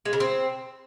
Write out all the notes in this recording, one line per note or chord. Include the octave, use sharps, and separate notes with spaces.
G#3
C#3
C4